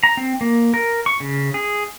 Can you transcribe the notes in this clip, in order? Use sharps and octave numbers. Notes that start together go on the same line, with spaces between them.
A#5
C4
A#3
A#4
C#6
C#3
G#4